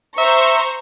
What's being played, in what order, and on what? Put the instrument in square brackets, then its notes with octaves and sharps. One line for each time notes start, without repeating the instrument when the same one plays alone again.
[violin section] C5 A#5 C#6 [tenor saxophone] E5